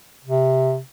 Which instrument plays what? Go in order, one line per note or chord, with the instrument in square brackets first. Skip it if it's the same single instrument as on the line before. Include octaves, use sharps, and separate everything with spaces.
[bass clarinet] C3